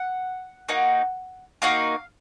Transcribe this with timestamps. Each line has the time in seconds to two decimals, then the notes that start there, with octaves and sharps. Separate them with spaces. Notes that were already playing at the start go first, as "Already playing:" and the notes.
Already playing: F#5
0.69 A#3 D#4 F#4
1.62 A#3 D#4 F#4 F5